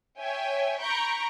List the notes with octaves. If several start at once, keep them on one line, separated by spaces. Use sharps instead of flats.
C#5 E5 G5 G#5
A#5 B5 C#6 G6 D7